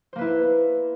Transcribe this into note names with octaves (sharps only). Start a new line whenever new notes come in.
A#3 E4 B4 C5